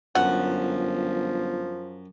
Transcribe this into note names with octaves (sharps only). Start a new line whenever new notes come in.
G1 F#2 F3 F#5